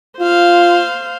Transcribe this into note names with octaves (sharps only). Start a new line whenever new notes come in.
F4 C5 F5